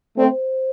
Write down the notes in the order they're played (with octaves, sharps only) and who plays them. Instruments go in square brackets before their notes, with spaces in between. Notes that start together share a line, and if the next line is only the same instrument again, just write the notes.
[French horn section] A3 C4 [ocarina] D5
[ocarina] C5